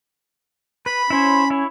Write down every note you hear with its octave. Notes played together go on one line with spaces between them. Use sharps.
B4 B5
C#4 E4 C5 C#5
E4 C#5